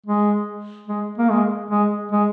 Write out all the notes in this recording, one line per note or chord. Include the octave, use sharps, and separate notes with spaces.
G#3
G#3
A#3
G#3
G#3
G#3